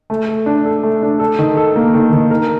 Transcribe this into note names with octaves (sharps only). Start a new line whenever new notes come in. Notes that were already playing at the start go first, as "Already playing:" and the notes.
A3
A4
D4
A4
A3
D4
A4
D#3
A4
A#3
D#3
D#3
A#4